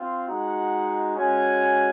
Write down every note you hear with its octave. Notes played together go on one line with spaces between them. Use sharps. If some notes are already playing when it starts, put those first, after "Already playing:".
Already playing: C4 F4
G#3 D#4 F#4 F#5
G#3 C#4 F#4 G#5